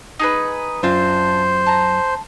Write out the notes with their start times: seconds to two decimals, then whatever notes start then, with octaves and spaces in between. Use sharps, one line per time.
0.19 D#4 G#4 B4
0.83 F#2 C4 D4 F4 C5
1.66 A5 A#5